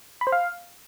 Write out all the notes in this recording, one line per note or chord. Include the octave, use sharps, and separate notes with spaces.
B5
C5
F5